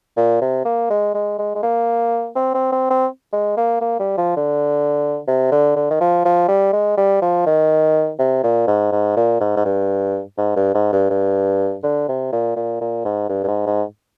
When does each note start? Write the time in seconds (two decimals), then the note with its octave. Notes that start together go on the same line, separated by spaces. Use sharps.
0.17 A#2
0.42 C3
0.65 A#3
0.90 G#3
1.15 G#3
1.39 G#3
1.55 G#3
1.63 A#3
2.36 C4
2.54 C4
2.72 C4
2.90 C4
3.33 G#3
3.57 A#3
3.81 A#3
3.99 G3
4.17 F3
4.37 D3
5.28 C3
5.52 D3
5.76 D3
5.90 D#3
6.01 F3
6.25 F3
6.49 G3
6.73 G#3
6.98 G3
7.22 F3
7.46 D#3
8.19 C3
8.43 A#2
8.67 G#2
8.92 G#2
9.17 A#2
9.40 G#2
9.56 G#2
9.65 G2
10.38 G#2
10.56 G2
10.75 G#2
10.93 G2
11.10 G2
11.83 D3
12.09 C3
12.32 A#2
12.56 A#2
12.81 A#2
13.05 G#2
13.29 G2
13.44 G2
13.48 G#2
13.67 G#2